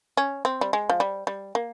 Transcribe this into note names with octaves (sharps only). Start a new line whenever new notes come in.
C#4
C4
G3
G#3
F3
G3
G3
A#3